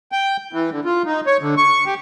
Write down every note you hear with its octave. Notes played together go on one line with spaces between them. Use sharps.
G5
E3
D3
F4
D#4
C#5
D3
C#6
G4